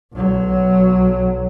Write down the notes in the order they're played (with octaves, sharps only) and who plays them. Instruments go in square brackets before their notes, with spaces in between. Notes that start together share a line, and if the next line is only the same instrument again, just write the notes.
[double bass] B1 F#3